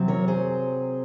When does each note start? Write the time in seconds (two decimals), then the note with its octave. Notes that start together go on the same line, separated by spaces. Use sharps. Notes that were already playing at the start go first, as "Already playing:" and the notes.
Already playing: C3 F#3 C4
0.08 A#4 C#5
0.28 G#4 C5